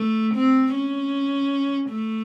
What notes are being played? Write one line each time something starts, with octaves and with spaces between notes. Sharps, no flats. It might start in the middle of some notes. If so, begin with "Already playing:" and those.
Already playing: A3
C4
C#4
A3